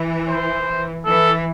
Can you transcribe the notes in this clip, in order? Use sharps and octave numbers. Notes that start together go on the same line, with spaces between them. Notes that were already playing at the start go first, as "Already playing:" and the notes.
Already playing: E3
C5
E3 A4